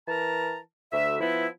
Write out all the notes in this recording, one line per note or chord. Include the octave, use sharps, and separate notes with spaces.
E3 A#4 A5 A#5
D2 E5
F3 B3 E4